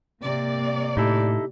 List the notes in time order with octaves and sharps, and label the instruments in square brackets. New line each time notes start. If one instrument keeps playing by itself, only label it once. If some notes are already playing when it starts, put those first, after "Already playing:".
[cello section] C3 A#3 D5
[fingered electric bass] A2 [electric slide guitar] D#4 E4 A4 [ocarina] G4